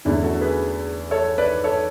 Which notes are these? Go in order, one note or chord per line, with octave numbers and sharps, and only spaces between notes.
E2 D3 A3 C#4 E4
F#4 A4
G#4 B4
A4 C#5
B4 D5
A4 C#5